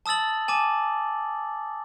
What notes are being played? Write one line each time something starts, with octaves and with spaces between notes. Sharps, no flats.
A5 D#6 E6 A6 F#7
G#5 A5 D6